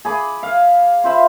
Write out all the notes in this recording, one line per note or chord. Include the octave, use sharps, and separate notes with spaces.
G#4 B5 D6
F5
F4 C5 E5 B5